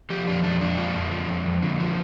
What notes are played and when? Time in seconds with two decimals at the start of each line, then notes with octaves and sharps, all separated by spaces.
0.10 F3 G4
0.27 F2 D4
0.44 F2 D4
0.61 F2 D4
0.78 F3
0.94 F2
1.11 F3
1.28 F2
1.46 F2
1.62 D3
1.80 F3